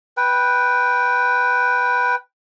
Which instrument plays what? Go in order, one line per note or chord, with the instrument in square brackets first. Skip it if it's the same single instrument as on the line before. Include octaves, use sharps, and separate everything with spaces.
[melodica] B4 G5